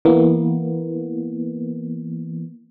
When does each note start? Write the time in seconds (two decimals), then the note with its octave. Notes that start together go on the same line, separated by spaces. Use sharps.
0.05 E3 A#3 B3